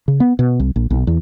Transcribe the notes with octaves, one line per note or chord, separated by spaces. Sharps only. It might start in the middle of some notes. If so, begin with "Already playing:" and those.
C#3
B3
B2
C2
A#1
B1
E2